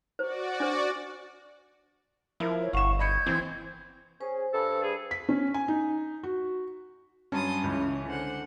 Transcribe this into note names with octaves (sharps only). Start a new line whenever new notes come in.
F#4 C5 D5
D4 C5
F3 E4 A#4
C#5
G1 E4 F5 F#5 C#6 E7
D#5 B5 G6 G#6 C#7
E3 C4 C5
C#4 G#4 C5
G2 A4
G#4
B6
C#4
G#5
D#4
F#4
G2 F#3 C#4 A5 C6 D#6
C#2 C#3 E3
D3 C5 F#5